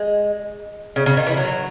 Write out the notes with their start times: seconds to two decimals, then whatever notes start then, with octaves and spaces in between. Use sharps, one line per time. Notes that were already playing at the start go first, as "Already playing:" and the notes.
Already playing: G#3
0.96 C#3
1.06 C#3
1.17 D#3
1.27 E3
1.37 F#3